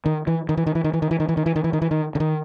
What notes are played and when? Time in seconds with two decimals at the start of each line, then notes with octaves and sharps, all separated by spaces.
0.06 D#3
0.27 E3
0.49 D#3
0.57 E3
0.66 D#3
0.75 E3
0.84 D#3
0.93 E3
1.02 D#3
1.11 E3
1.20 D#3
1.29 E3
1.37 D#3
1.46 E3
1.56 D#3
1.64 E3
1.73 D#3
1.82 E3
1.91 D#3
2.15 D3
2.20 D#3